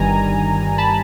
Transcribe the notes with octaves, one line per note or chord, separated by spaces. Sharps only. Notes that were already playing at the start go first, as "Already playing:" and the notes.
Already playing: G1 G2 D#3 G3 G#5 A#5
A5 B5